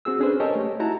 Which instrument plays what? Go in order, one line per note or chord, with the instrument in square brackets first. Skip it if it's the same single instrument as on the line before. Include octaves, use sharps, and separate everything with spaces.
[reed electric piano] C4 F#4 G#4 E6
C#4 D4 G#4 A4 B4 C5
G4 A#4 C#5 D#5 G#5 A5
A3
D#4 E4 F#4 A5 A#5